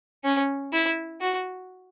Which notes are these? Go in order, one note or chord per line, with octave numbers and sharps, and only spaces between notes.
C#4
E4
F#4